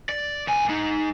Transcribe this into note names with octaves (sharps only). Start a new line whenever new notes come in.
D5
C2 G#5
G#3 D#4